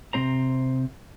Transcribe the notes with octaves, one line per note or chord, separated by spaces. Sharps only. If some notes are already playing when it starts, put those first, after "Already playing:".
C3 E3 C4 C5 A#5